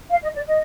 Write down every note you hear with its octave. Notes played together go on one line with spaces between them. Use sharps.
F5
D#5
D5
D#5